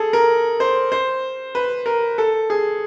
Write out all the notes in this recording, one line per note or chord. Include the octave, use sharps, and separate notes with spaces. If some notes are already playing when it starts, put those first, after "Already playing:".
Already playing: G#4 A4
A#4
C5
C5
B4
A#4
A4
G#4